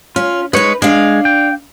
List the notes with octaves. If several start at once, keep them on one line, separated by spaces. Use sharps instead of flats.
C#4 F4
G#3 D#4 B4 C#5
G#3 D4 F5
G5